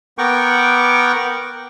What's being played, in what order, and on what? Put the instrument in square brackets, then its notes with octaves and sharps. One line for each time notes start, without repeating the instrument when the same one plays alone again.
[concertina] B3 A#4 F#5 G5 C#6 D6